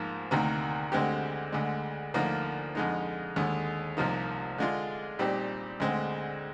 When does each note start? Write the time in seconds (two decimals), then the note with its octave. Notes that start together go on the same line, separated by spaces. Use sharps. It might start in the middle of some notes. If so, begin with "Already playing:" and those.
Already playing: G#2 F3 A#3 D#4
0.31 D2 C3 D#3 A#3
0.92 D2 D3 G#3 C4 G4
1.52 D2 D3 G#3
2.14 D2 D3 F3 A#3 D#4
2.75 F2 D3 G#3 D#4
3.36 D#2 D3 G#3
3.97 C2 C3 F3 A#3 D#4
4.58 D3 G#3 D4 F4
5.19 A#2 G3 C4 D#4 G4
5.80 D2 D3 G#3 C4